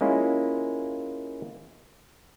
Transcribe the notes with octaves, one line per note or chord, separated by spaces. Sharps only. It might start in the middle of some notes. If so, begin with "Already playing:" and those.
G#3 A#3 C#4 E4 F4